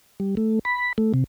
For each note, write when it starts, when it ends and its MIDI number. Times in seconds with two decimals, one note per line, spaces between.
0.20 0.35 55
0.37 0.59 57
0.65 0.93 83
0.98 1.13 57
1.14 1.24 48